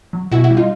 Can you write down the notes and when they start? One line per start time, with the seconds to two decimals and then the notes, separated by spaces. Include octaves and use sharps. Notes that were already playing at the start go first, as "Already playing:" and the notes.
0.13 F#3
0.31 B2 E4 F#4
0.44 E4 F#4
0.51 G3
0.57 D#4 F4